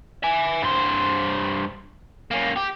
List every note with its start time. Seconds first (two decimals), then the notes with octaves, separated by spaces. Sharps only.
0.23 E5 G#5
0.62 G2 C5
2.31 A#3 C#4
2.56 G4